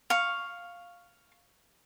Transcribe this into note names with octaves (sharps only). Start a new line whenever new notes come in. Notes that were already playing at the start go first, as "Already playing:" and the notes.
F5 C#6